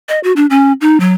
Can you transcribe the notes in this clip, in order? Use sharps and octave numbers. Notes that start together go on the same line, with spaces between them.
D#5
F#4
D4
C#4
D#4
F#3